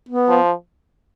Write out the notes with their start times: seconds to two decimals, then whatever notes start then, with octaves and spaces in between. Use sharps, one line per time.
0.09 B3
0.28 F3